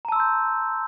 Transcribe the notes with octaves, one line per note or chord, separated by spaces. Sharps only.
A5 A#5 C6 E6 G6